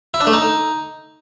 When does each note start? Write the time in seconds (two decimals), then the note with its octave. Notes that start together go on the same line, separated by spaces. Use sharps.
0.14 E4
0.20 D4
0.27 A3
0.33 D#4